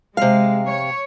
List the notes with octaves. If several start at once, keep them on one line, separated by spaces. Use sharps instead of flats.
C3 G#3 F5
C#5